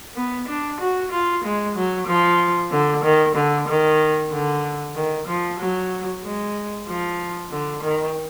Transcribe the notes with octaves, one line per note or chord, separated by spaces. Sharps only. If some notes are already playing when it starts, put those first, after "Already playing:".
B3
D4
F#4
F4
G#3
F#3
F3
D3
D#3
D3
D#3
D3
D#3
F3
F#3
G#3
F3
D3
D#3